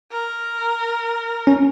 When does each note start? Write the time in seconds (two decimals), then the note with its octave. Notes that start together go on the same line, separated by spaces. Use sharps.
0.12 A#4
1.47 C#4